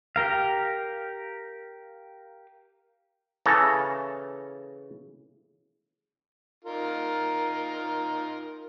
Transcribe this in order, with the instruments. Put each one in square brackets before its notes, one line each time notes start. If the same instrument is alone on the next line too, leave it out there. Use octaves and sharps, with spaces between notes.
[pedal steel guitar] G4 A#4 F5
[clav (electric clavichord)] C#3 E3 A4 A#5
[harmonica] D#4 F4 A#4